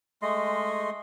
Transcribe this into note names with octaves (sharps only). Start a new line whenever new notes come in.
G#3 A3 D#5 C6